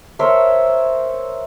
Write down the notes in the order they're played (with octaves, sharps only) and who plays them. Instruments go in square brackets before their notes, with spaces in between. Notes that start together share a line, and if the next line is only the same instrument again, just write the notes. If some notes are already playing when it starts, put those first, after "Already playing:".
[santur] A#4 C5 C#5 E5